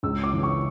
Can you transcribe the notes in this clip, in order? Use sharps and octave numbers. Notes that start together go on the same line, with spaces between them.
C#2 E6
D6
C#3 E3
C#6